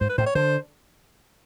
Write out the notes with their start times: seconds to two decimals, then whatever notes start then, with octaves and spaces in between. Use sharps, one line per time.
0.01 G#2 C5
0.10 B4
0.18 A2 C5
0.26 C#5
0.35 D3 C5